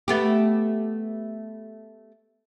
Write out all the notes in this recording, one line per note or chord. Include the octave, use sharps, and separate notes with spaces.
A3 B3 G4